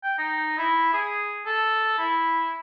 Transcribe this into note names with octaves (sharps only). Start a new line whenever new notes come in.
G5
D#4
E4
G#4
A4
E4